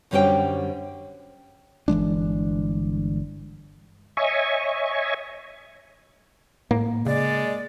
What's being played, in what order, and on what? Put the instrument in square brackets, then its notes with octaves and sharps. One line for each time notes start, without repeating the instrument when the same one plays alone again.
[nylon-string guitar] F#2 D3 G3 C#4 C5 G5
[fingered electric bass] G1 E3 G#3 D4
[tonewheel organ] C#5 D#5 E5 G#5 C#6
[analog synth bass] A2 [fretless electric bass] A#3
[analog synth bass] C#3 [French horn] G#3 [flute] D5